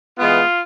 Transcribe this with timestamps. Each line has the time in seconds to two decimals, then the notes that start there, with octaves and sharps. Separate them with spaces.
0.19 E3 G#3 B3 F4